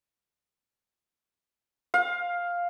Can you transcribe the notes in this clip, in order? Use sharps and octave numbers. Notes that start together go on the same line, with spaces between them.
F5